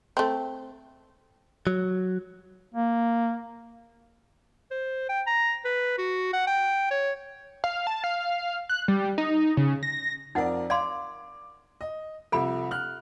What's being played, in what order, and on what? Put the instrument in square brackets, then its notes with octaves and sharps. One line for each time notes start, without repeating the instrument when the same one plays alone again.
[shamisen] A3 C4
[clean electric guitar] F#3
[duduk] A#3
[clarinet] C5
G5
A#5
B4
F#4
F#5
G5
C#5
[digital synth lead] F5
A5
F5
F#6
G3
D#4
C#3
A#6
[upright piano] F2 A#4 D5 [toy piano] D#4 F#5
[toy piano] D5 F5 C6 [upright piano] D6
[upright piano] D#5
[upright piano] C2 F3 E5 [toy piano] A4 B5
[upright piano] F6 F#6